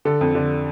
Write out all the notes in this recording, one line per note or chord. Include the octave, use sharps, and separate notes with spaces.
D3 A4
F2
D3